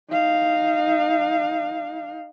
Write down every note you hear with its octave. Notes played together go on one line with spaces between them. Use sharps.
D#4 F5